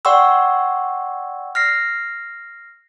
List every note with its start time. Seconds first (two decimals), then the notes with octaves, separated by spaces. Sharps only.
0.05 D5 F#5 G5 C6 C#6 E6
1.55 F6 A#6 C7